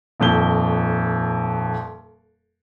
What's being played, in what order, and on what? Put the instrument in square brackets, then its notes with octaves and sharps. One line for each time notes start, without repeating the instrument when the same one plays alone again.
[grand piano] D#1 F2 G7